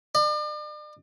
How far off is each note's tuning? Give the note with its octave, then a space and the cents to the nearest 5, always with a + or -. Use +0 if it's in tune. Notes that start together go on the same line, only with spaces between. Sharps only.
D5 +40